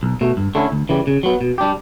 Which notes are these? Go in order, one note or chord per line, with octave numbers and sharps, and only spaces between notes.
B1
B2 A3
G2
D3 A3 C#4 E4
D2
C#3 E3 G3
C#3
F#3 B3
B2
G3 D4 G4